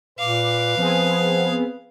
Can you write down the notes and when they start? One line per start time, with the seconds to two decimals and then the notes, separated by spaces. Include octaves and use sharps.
0.19 A#2 B4 F5 D6
0.78 F3 B3 C4 G#4